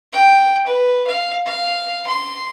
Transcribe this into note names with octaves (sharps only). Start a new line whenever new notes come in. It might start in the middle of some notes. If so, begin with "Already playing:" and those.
G5
B4
F5
F5
C6